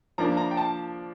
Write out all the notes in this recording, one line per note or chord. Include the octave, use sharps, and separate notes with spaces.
F3 A#3 D4 A#5
A#5
G5
A5